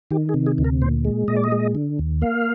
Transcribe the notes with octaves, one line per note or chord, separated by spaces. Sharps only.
D#3 G4
G#4
C3
G#4
D2
A#4
A#2 C5
G#3
A#2 D#5
D5
D#5
G#3
D3
D#2
A#3 F5